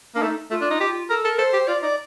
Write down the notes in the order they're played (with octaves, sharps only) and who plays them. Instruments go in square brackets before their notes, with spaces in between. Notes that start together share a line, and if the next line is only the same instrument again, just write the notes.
[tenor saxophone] A#3 [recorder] D4
[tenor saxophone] A3 [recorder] D#4
[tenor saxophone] A3 [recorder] F4
[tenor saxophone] D4
D#4
G4
[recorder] A4 [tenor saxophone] A#4
[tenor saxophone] A4 [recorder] A#4
[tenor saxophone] A4 [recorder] C5
[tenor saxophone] G4
[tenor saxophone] F4 [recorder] D5
[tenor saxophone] D#4 [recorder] D5